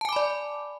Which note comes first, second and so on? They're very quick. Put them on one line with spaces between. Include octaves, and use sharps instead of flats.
A5 G#5 D6 B5 D5